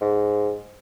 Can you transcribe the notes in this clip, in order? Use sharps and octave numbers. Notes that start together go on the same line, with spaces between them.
G#2